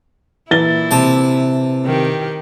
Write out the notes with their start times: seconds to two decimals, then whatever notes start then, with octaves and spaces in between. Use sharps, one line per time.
0.51 A#2 E3 E4 A6 G7
0.91 C3 A5
1.85 D#3 G4